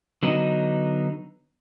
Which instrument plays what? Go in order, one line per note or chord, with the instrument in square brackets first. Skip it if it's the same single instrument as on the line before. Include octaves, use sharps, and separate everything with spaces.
[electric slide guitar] D3 F#3 B3 D#4